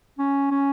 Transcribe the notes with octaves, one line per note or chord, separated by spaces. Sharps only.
C#4
C#4